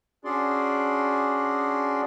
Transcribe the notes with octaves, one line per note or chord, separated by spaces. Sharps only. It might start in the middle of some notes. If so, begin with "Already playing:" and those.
C#4 D4 F#4 G#4 D5 C6